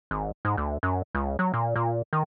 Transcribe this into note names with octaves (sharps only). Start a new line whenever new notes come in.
G#1
G#2
D2
F#2
C#2
F#3
A#2
A#2
D#3